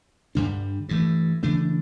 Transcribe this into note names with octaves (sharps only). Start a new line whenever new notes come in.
G2 D3 G3 D4
G2 E3 A3
C#3 E3 A3 D4